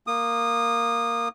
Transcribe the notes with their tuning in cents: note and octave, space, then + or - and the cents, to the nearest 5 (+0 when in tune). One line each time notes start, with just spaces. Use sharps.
A#3 +0 D#6 -20